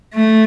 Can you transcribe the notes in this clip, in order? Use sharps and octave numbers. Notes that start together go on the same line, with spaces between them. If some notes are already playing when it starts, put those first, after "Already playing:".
A3